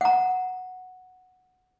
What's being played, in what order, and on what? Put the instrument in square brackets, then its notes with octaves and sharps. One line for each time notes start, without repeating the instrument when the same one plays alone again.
[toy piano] F#5 A#5